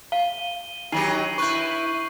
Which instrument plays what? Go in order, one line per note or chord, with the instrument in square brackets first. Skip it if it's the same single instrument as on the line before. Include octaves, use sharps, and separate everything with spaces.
[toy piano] F5 [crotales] D#7 G7
[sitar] D#3 F#3 G4 [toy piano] D4 [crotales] C7 D#7 F#7
[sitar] E4 B4 [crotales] C#6 F#6 G6